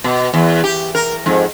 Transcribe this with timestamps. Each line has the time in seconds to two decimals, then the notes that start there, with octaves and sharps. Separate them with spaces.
0.04 B2
0.34 E2
0.64 G4
0.95 A#4
1.26 F2 G#2